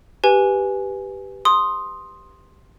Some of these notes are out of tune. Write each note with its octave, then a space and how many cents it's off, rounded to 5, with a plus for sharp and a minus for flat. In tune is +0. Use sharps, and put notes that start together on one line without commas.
G4 +0 B4 +0 G#5 +5
C6 +5 D#6 +0